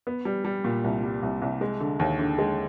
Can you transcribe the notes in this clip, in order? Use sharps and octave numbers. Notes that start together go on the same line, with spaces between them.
B3
G3
G3
A#2
C2
G3
C2
C2
G#3
D3
D#2
D3
G#3